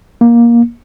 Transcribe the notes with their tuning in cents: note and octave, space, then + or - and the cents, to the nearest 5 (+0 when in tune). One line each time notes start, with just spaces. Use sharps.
A#3 +15